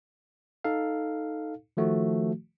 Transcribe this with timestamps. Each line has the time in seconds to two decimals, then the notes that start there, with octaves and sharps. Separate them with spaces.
0.64 D#4 A4 F5
1.77 D#3 F3 A3 F#4